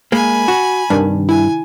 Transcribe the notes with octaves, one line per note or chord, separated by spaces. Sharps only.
G#3 A#3 G#5 B5
F#4
G2 C3 D#3 D4
E4 G#5